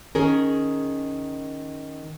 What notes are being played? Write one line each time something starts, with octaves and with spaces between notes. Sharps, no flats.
D#3 C#4 G#4 A#4